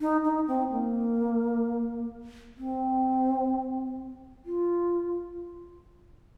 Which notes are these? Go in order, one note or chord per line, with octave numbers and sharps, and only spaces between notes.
D#4
D#4
C4
A#3
C4
F4